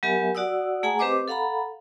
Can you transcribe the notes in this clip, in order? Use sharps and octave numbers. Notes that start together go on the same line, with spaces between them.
F#3 B3 G4 A#4 E5 G#5
F#4 D5 F#5 D#6 E6
A3 G#4 F#5 G#5 A#5
C4 G4 B4 C5 D#5 D6
A4 F5 F#5 A#5 B5